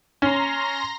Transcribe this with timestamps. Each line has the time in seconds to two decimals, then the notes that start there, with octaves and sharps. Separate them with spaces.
0.22 C#4 A#5 C6 A#6